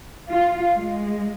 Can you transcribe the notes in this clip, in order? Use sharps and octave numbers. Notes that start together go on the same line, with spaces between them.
F4
G#3